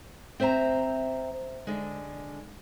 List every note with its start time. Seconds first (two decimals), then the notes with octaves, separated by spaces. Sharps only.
0.40 C4 C5 E5 G#5 A#5
1.67 D3 G#3